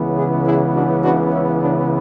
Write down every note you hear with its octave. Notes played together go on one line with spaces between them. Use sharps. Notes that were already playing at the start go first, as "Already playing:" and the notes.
Already playing: C#2 C#3 E3 B3
E4 G#4
E4 G#4
D4 F#4
D4 F#4
C#4 E4
D4